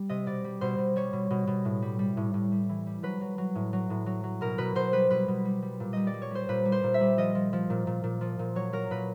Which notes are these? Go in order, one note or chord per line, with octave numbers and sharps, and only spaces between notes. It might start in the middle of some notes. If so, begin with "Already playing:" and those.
Already playing: G3
C3 D#5
B2 D5
G3
B2 C5
B2
G3 C#5
B2
B2
B2
A2
G3
G3
A2
A2
G3
E3
G3
F#3 B4
F#3
F#3
A2
F#3
A2
F#3
F#3
B2 A#4
B2 B4
B2 C5
G3 B4
B2 B4
B2
G3
G3
A#2
G3 D#5
D5
G3
C#5
G3 C5
A#2 B4
G3
C5
A#2
E5
G3
F3 D#5
F3
F3
A#2
A#2
A#2
F3
A#2
F#3 C#5
F#3 A#4
A#2 B4